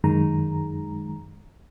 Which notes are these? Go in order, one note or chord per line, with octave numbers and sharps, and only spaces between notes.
F#2 D#3 G#3 A#5